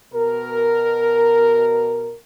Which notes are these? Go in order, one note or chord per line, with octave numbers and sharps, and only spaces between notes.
B2 A#4